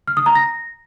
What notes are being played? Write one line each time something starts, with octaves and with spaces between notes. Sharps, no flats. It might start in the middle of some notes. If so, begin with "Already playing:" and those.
F6
D#6
A#5
A#6